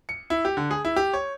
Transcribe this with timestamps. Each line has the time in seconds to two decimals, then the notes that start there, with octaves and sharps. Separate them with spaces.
0.09 C#7
0.30 E4
0.45 G4
0.57 D3
0.71 G#4
0.85 E4
0.96 G4
1.14 C#5